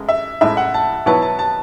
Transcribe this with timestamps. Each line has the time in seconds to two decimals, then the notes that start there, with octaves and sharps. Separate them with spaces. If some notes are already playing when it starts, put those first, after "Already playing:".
Already playing: A1 G#3
0.09 E5
0.41 A1 A2 G#3 E5
0.57 F#5
0.74 A5
1.06 B2 F#3 B3 E4 B4 A5
1.22 A5
1.39 A5